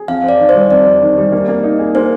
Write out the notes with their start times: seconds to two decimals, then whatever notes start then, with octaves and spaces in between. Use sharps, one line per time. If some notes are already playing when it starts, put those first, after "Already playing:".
Already playing: G#4
0.08 F2 F5
0.24 C4
0.29 D5
0.39 D#3
0.49 C5
0.55 G3
0.70 F2 D5
0.86 C4
1.02 D#3
1.18 G3
1.32 A#3
1.48 A#3
1.64 D#4
1.79 G#4
1.95 A#3 C5